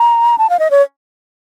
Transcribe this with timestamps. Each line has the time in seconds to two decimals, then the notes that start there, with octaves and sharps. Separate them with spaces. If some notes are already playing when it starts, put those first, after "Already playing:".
Already playing: A#5
0.38 A5
0.50 F5
0.59 D#5
0.71 C#5